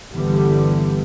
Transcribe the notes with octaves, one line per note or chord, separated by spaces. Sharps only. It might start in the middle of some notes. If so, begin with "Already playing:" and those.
G1 D3 E3 G3 B3